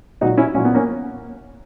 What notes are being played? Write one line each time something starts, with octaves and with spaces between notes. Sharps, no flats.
A#2 F#3 D#4 F#4
C#4 E4
A#2 F#3 C#4
B3
A#3 C#4